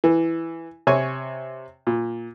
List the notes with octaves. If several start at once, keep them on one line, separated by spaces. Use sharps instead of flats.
E3
C3 C#5 G#5 C#6
A#2